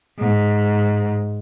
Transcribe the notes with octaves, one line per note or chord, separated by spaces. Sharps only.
G#2